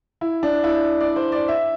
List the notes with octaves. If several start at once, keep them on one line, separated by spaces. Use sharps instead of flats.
E4
D4
E4
D5
C5
D5
E5